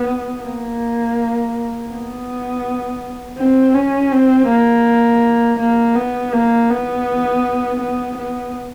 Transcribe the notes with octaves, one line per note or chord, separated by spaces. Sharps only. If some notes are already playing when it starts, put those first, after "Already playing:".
Already playing: B3
A#3
B3
C4
C#4
C4
A#3
A#3
B3
A#3
B3
B3
B3